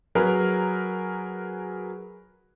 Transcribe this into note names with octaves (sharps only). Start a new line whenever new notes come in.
F#3 G#4 A#4 B4